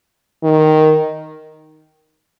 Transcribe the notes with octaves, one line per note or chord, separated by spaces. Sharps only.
D#3